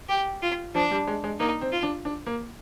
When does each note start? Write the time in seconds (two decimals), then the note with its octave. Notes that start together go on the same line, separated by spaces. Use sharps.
0.09 G4
0.43 F4
0.75 F3 D4
0.91 G3
1.07 G#3
1.24 G#3
1.40 A#3 D#4
1.61 C4
1.72 F4
1.83 D4
2.05 D4
2.27 A#3